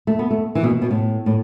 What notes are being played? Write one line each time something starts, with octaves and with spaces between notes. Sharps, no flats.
A3
B3
A3
E3
B2
B2
A2
A2